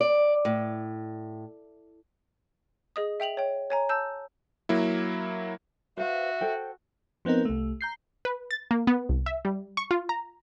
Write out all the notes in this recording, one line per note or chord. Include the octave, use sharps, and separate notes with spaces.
D5
A2
G#4 D#5 D#6
E5 G5 F7 F#7
C#5 G5
C#5 G#5 A#5
A5 E6 G6
F#3 A#3 E4
F#4 B4 C5 E5 F5
A4 C5 G5
F3 B3 C4 D#4 A#4
C2 A3
A#5 G6 C7
B4
A6
A#3
B3
C2
E5
G3
C#6
F4
A#5